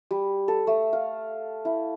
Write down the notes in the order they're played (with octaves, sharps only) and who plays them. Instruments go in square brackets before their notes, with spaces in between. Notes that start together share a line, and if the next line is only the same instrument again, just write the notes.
[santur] G3
A4
A3
F5
E4